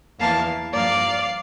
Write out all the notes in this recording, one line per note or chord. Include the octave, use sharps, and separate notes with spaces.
E2 E3 A#3 F5 A5
G2 F3 A#3 D5 F5